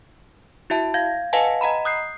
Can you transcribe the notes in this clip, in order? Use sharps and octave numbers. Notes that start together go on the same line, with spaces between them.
E4 F#4 E5 A5
F5 G6 G#6
B4 D#5 F5 F#5 G#5 A5
D#5 F#5 A#5 B5
D#6 F#6 G6 C7